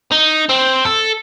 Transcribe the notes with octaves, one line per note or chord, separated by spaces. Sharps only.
D#4
C4
A4